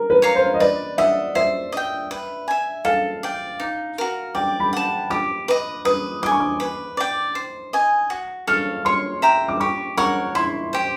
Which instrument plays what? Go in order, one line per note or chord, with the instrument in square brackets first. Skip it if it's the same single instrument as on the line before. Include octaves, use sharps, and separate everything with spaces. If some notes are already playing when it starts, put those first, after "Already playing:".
Already playing: [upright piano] A#4
B4
[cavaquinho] C#5 F5 A#5
[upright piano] C5
D#5
[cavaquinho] B4 [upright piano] D5
[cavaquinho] D#5 F#5 [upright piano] E5
[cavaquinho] C5 [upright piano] E5
[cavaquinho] D#5 G5
B4
E5 G#5
[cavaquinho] A4 [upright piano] F5
[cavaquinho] D5 G5
D#4
F#4 A#4
[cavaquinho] D5 [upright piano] G5
[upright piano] B5
[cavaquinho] F#5 A5
[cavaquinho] G4 [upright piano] D6
[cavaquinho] B4 D#5
[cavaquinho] B4 [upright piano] D#6
[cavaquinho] D#5 G#5 [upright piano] D6
[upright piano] C#6
D6
[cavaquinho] B4
D5 G5
C5
D#5 G#5
F#4
[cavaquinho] A4 C#5 F5 [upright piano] F6
[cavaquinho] C#5 [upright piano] C6
[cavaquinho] E5 G5 A#5
[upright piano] D6
[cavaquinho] G4 [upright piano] C#6
[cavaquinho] A#4 C#5 F#5 [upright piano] C#6
[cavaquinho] E4 [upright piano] C6
[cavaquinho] G4 C5